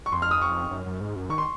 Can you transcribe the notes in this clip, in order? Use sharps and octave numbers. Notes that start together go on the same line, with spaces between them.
C#6
F2 C6
F6
D#6
C#6
F#2
F#2
G#2
F#2
D#3 C#6
C6